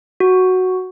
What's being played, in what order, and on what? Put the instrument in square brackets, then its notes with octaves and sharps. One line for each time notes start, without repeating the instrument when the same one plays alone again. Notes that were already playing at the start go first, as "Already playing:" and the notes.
[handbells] F#4